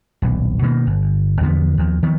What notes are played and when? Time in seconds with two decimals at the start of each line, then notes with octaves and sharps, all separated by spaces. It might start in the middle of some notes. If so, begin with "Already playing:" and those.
0.22 D#1 B1
0.62 B2 D#3 G#3 A#3
0.87 G1
1.41 E2 D3 F3 B3
1.77 D#2 F3
2.03 D#3 F3 B3